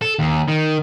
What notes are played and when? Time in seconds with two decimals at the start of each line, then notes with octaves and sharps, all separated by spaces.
0.02 A4
0.19 D#2
0.49 D#3